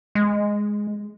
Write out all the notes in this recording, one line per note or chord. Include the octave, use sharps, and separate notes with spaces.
G#3